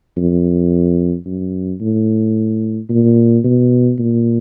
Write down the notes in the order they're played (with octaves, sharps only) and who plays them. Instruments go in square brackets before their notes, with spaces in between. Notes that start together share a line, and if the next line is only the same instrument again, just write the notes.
[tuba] F2
F#2
A2
A#2
B2
A#2